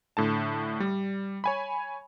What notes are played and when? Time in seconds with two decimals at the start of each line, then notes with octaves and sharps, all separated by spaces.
0.17 A2 D3 A5
0.80 G3
1.44 C#5 G#5 B5